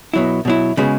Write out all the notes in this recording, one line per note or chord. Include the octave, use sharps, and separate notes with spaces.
B2 F#3 E4
B2 F#3 E4
C#3 G#3 B3 F#4